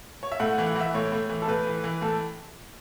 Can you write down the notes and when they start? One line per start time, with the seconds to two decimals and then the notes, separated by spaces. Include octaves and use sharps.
0.23 C#5
0.32 E5
0.40 A2 F#5
0.53 F#5
0.58 E3
0.67 F#5
0.75 E3
0.81 E5
0.94 A2 C#5
1.12 A2
1.29 E3
1.42 A4
1.47 A2 B4
1.66 E3
1.84 E3
2.01 A2 A4